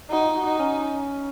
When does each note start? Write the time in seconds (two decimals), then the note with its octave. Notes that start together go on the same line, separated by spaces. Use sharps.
0.11 D#4 F#4
0.25 F4
0.35 F#4
0.47 D#4
0.59 C#4